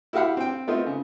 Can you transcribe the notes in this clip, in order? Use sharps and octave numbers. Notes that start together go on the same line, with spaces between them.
E4 F#4 G4 F5 F#5 B5
C4 G5
A3 B3 C4 D#4 F4
C#3